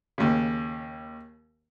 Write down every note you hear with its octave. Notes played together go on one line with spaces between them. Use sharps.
D#2 C#3